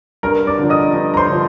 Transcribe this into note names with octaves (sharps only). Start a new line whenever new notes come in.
G2 A#4 A#5
D5 D6
D3 F3
D#5 D#6
G2
A#5
C5 C6
D3 F3